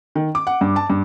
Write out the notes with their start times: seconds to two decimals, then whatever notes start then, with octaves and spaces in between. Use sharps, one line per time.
0.15 D#3
0.35 D6
0.47 F#5
0.61 G2
0.76 A5
0.90 G2